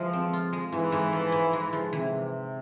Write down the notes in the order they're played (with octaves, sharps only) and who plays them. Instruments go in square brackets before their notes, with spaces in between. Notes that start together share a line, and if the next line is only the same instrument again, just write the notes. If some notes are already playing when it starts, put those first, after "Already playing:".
Already playing: [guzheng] E3 G#3 [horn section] F3
[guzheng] C4
F4
G#3
[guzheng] G#2 [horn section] E3
[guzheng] G#2
F3
G#2
G#3
F3
[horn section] C3 [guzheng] E3